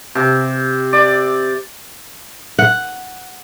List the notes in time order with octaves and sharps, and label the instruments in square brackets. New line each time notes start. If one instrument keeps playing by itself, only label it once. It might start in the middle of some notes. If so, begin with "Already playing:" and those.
[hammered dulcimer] C3
D5
[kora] F#5